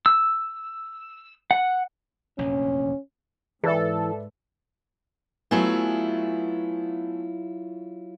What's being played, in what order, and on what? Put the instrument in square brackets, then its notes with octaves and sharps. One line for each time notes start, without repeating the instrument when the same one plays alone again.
[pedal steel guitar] E6
F#5
[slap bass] F1 A#1 F#2 [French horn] C#4
[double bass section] G#2 [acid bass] E3 [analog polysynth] A4 [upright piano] B4 D5 E5
[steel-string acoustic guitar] F#3 E4 F4 [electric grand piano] A3 B3 G#5